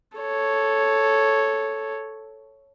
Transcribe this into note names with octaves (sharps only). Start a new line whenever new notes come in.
A4 C#5